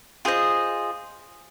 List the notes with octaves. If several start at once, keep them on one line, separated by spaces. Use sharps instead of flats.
F4 G#4 C5 D#5